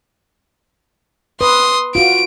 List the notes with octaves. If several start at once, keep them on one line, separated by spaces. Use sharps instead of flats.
B4 C6 D#6
F4 F#4 D7